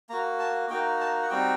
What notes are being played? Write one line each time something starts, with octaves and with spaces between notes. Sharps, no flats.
A#3 F#4 A#5
A5
A#3 D#4 F#4 G5
A5
F#5
G3 C4 D#4 F#4 G5